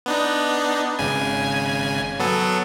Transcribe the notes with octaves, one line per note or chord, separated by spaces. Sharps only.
B3 D4 D#4
G#1 C#3 G#5
F#3 B3 A4